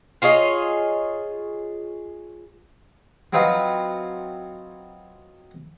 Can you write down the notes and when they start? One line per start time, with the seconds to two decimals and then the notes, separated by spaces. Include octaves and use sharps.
0.22 F4 G#4 C#5 D#5
3.33 F#3 C4 D#4 F4 B4